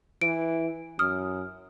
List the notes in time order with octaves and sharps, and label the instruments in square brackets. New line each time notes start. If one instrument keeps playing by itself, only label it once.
[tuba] E3 [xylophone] D7
[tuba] F#2 [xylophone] D#6 F6